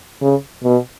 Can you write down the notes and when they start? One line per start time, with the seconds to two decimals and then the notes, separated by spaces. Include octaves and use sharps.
0.21 C#3
0.64 B2